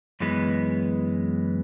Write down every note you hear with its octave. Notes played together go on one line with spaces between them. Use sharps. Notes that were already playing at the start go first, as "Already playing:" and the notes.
F#2 E3 G#3 B3